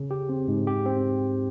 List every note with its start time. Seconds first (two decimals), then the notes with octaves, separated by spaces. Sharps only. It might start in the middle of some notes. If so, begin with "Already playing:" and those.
Already playing: C#3
0.11 G4
0.29 C4
0.48 G#2
0.67 G4
0.86 C4